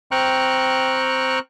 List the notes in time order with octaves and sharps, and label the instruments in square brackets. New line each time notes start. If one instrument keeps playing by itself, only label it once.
[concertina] C4 G5 A#5 C#6 F6 F#6